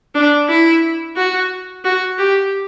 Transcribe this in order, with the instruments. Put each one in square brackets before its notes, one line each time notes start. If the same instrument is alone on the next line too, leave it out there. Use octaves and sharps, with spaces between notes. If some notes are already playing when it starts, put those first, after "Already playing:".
[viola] D4
E4
F#4
F#4
G4